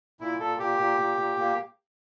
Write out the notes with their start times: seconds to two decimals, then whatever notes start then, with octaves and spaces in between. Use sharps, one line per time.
0.20 A#2 E4
0.40 A#2 A4
0.59 A#2 G4
0.79 A#2
0.98 A#2
1.17 A#2
1.36 A#2 A#3